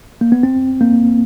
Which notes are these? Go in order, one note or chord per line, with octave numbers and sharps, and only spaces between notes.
A#3
B3
C4
A#3